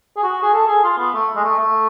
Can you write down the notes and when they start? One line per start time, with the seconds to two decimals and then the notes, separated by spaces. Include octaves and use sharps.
0.17 G#4
0.23 F#4
0.43 G#4
0.54 A4
0.68 G#4
0.84 F4
0.98 B3
1.14 A3
1.36 G#3
1.44 A3
1.59 A3